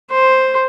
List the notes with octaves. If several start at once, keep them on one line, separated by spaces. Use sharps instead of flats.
C5